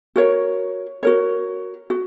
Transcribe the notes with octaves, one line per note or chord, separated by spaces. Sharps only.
F#4 A#4 C#5
F#4 A#4 C#5
F#4